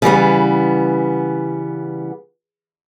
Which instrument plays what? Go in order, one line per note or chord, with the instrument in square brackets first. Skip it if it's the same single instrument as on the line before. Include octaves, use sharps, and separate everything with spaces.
[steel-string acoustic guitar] C#3 E3 G3 B3